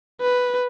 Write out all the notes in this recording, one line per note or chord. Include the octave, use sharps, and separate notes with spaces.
B4